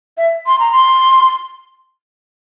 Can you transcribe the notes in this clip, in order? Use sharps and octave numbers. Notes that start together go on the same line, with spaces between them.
E5
C6
A#5
C6